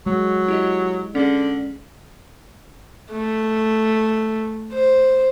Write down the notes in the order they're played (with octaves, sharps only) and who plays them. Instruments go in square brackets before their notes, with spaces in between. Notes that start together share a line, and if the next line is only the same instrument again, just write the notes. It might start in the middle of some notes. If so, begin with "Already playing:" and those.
[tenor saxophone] F#3 [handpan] G#3
[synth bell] E4 G4 D#5
[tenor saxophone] D3 [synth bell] C#4 G#4
[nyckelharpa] A3
C5